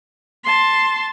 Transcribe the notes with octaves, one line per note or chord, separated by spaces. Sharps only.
A5 C6